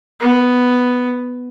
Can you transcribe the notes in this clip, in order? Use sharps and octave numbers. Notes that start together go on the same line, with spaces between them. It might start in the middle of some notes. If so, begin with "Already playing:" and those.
B3